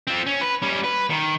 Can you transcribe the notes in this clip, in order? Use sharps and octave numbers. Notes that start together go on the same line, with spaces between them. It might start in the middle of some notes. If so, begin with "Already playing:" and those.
C4 F4
C#4
B4
G3 C#4
B4
D#3